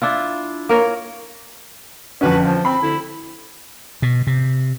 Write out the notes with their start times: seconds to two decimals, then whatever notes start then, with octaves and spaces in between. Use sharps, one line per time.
0.02 D4 E4 F4
0.69 A#3 A#4 C#5
2.21 F2 D3 C#4 F#4 B4
2.44 F3
2.65 C4 B5
2.82 D2 D3 E4
4.02 B2
4.27 C3